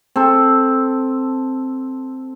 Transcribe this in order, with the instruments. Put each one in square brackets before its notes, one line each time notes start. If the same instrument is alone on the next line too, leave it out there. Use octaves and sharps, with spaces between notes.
[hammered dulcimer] C4 A4